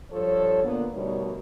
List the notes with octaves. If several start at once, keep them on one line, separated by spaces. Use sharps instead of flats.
G2 F3 A4 C#5
A#2 D3 A#3 B3
D2 B2 G3 D#4 A#4 C#5